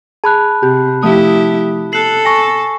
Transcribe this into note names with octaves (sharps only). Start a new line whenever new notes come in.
G#4 A5 B5 F#6
C3 G4
F3 A3 E4 G4 D#6
A4 F#6 C7 F#7
G#5 C#6 A#6